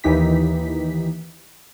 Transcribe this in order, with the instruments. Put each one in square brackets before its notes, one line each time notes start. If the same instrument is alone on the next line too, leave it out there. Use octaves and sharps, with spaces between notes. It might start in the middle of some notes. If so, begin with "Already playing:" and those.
[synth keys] D#2 E3 D#4 G4 B6